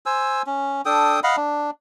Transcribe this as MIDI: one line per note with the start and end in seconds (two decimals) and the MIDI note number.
0.06 0.42 72
0.06 0.42 80
0.06 0.42 88
0.46 0.82 61
0.85 1.20 62
0.85 1.20 69
0.85 1.20 79
0.85 1.20 87
1.23 1.36 75
1.23 1.36 77
1.23 1.36 78
1.23 1.36 83
1.37 1.71 62